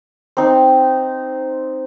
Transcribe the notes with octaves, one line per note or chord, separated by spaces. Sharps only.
C4 D#4